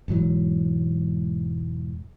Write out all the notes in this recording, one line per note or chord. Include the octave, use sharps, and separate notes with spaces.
E1 G#2 E3 F#3